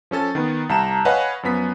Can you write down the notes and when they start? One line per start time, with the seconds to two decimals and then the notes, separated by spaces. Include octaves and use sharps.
0.11 F3 C#4 A4 A6
0.35 D#3 B3
0.69 C2 A5 A#5 E7
1.05 B4 C#5 D#5 F5 F#5 G#5
1.43 F#2 F3 B3 B6